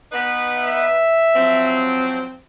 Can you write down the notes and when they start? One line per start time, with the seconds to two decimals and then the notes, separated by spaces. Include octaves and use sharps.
0.12 B3 D#4 B4
0.56 E5
1.35 F3 F#3 C4